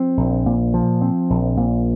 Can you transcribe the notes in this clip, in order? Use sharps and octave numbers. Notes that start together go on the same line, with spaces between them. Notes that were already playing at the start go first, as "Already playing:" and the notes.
Already playing: F3 C4
A#1
A#2
F3
C4
A#1
A#2